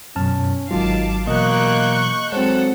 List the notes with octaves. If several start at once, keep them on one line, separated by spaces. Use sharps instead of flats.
F#2 B2 C#4 A5 F6
G#1 G#2 D#3 F#3 F4 F5 A5 D6
B2 E3 F#3 A#3 D#5 C#6 F#6 G6
F#3 G#3 C4 A4 C5 C#5 F#5